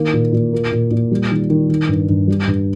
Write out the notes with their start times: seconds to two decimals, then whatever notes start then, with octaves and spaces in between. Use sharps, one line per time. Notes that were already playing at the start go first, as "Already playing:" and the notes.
Already playing: D#3 A#3
0.13 A#2
0.33 A#2
0.53 A#3
0.72 A#2
0.91 A#2
1.11 G3
1.31 D#3
1.50 D#3
1.69 D#3
1.89 G2
2.09 G2
2.28 G3
2.47 G2